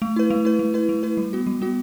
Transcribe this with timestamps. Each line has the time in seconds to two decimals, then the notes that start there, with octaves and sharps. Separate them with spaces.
0.02 A3
0.16 E4 B4
0.30 A3
0.45 E4 B4
0.59 A3
0.74 E4 B4
0.89 A3
1.03 E4 B4
1.17 G3
1.33 B3 F#4
1.47 G3
1.62 B3 F#4